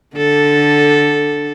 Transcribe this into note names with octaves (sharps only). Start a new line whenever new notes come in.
D3 A4